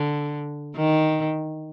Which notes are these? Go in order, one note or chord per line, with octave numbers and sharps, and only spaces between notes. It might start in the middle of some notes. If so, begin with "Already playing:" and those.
Already playing: D3
D#3